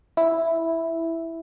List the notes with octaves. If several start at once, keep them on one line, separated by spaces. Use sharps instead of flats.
E4